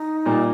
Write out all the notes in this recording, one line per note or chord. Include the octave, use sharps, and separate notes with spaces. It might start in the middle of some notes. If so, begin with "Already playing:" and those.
Already playing: D#4
A#2 G3 A#3